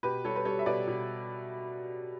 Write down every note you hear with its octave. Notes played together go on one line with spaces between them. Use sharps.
B2 G4 B4
G3 A4 C#5
B4
G3 A4 C#5
E5
B2 B4 D5
B2